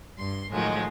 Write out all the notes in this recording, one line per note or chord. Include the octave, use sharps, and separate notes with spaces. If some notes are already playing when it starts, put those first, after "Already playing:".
G2 C6
A2 D#3 F3 F#3 G#3